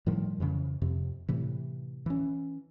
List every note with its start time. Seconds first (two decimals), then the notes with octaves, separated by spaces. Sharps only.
0.06 A2 D#3 F3 G3
0.40 F2 C#3 E3
0.82 F2 C3
1.29 A2 C3 E3
2.06 E3 C#4